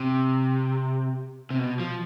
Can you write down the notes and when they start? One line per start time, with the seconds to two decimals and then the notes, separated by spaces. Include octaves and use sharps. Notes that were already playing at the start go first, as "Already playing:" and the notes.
Already playing: C3
1.50 C3
1.59 B2
1.80 F3